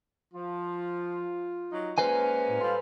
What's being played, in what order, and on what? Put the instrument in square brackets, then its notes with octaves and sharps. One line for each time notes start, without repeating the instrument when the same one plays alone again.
[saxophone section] F3 [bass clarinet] F4
[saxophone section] F#3 D#4
[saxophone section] G#3 A#3 C#4 [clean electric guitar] B4 C5 G#5
[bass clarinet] A2
[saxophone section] G3 F4 [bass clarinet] A4